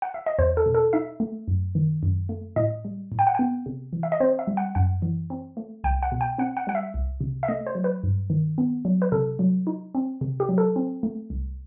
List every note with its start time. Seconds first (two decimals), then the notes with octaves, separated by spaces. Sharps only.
0.02 F#5
0.14 E5
0.26 D#5
0.38 E2 C5
0.57 A4
0.66 B2
0.75 A4
0.93 D#4 E5
1.20 A3
1.48 F#2
1.75 D#3
2.03 F#2
2.29 A3
2.56 A2 D#5
2.85 G3
3.12 A2
3.19 G5
3.27 F#5
3.35 B3 G5
3.66 C3
3.93 E3
4.03 E5
4.12 D#5
4.20 C4 C5
4.39 E5
4.47 G3
4.57 F#5
4.75 F#2 F#5
5.02 E3
5.30 C4
5.57 A3
5.84 C2 G5
6.03 F#5
6.12 B2
6.21 G5
6.38 C4 F#5
6.57 F#5
6.67 G3 F#5
6.75 E5
6.94 C2
7.21 C3
7.43 E5
7.48 A3 D#5
7.67 C5
7.75 F#3
7.84 B4
8.03 G2
8.30 D#3
8.58 B3
8.85 F#3
9.02 B4
9.12 C3 A4
9.39 F#3
9.67 D#4
9.95 C4
10.21 C3
10.40 G4
10.49 F#3
10.58 A4
10.76 C4
11.03 A3
11.30 C2